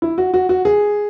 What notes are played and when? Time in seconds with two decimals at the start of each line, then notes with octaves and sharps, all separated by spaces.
0.02 E4
0.18 F#4
0.34 F#4
0.49 F#4
0.65 G#4